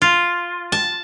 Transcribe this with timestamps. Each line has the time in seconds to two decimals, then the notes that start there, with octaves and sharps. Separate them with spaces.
0.02 F4
0.72 A5